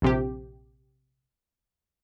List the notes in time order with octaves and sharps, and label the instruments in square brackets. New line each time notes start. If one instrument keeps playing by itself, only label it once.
[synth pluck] A#1 C3 G4